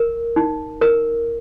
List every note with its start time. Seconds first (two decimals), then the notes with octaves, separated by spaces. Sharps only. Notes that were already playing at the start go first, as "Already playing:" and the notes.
Already playing: A#4
0.36 D#4
0.81 A#4